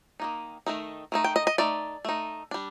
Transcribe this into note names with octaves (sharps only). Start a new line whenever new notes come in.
D#3 A#3 D#4
D#3 A3 D#4
D#3 A3 D#4
G5
D#5
D#5
A3 D#4 D5
A3 D#4
G3 D4